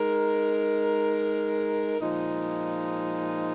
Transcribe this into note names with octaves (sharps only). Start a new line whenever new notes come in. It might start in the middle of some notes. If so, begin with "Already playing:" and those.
Already playing: G#3 D#4 A#4
A#2 F3 G#3 D#4